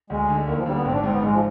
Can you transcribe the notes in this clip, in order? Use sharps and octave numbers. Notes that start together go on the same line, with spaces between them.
D2 G#3
D3
D#2 D#3
F3
D3 G3
B3
G#1 C4
D4
G#2 C4
B3
G#2 G#3
F3